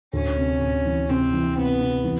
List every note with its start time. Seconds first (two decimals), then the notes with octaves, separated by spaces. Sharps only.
0.13 D2 C#4
0.37 C3
0.61 D2
0.85 E3
1.09 C3 C4
1.33 E3
1.57 C3 B3
1.81 C3
2.04 E3